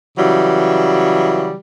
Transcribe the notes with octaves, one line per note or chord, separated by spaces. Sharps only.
C#3 E3 F#3 G3